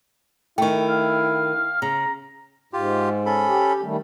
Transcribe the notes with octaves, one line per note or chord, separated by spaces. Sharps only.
D#3 A3 E4 G5 C#6
F5
C#3 A#5
G#2 F4 G4
C#4 A4 B5
G4
D#3 G3 A3